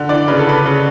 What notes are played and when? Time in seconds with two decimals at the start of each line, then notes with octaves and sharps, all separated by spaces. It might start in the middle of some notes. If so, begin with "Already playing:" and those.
Already playing: D3
0.09 E3 D5
0.28 C#3 B4
0.39 A4
0.47 C#3 B4
0.66 C#3